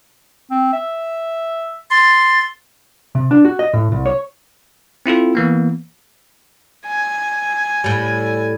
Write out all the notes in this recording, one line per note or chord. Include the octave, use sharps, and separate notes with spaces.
C4
E5
C6 A6
C3
D4
F#4
D#5
A2
C2
C#5
C4 E4 F4 A4
E3 A#3 B3
G#5
A2 G3